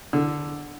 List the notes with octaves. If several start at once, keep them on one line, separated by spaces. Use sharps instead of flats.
D3